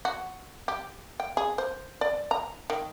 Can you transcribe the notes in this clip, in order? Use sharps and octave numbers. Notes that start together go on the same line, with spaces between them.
F#4
G4
G5
G#4
C5
D5
A#5
D#3